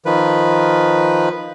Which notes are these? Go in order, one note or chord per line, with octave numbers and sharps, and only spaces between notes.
D#3 F3 B4